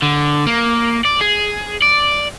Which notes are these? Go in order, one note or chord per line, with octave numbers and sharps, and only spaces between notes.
D3
A#3
D5
G#4
D5